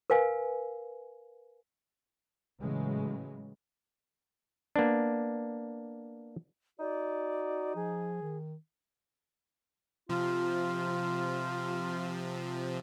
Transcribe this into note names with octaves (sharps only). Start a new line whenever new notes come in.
A#4 B4 F5 G#5
A2 C#3 E3 F#3 G#3
A#3 B3 D4
D#4 F#4 D5
F3 G#4
D#3
C3 F3 F4